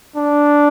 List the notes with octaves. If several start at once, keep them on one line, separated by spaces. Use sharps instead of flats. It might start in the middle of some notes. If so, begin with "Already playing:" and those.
D4